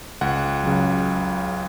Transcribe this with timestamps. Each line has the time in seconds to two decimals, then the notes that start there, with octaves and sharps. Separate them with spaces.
0.21 C#2 F#5
0.64 C#3 F#3